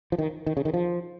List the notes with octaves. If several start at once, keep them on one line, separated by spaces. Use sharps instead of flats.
F3
D#3
D#3
C#3
D#3
F3